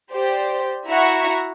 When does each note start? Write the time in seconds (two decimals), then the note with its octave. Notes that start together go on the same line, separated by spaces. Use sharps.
0.13 G4 C5 D5
0.88 E4 F#4 E5 F#5 A#5 C#6